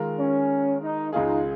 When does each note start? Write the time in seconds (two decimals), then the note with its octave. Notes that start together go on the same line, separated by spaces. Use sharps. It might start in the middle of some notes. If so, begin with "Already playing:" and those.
Already playing: D#3 G#3 F4 A#4
0.19 C#4
0.82 D#4
1.13 C#2 C#3 G#3 D#4 F4 G#4